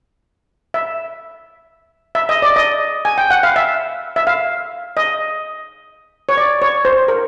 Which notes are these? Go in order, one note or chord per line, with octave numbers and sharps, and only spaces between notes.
E5
E5
D#5
D5
D#5
G#5
G5
F#5
F5
E5
E5
F5
D#5
C#5
D5
C#5
C5
A#4